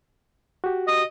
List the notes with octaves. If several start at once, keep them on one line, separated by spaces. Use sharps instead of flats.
F#4 G4
D#5